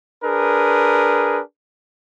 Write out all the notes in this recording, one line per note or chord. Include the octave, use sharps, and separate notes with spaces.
D4 G#4 A#4 B4